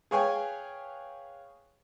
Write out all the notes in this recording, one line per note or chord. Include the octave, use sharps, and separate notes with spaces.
G#4 B4 C#5 F5 G5 G#5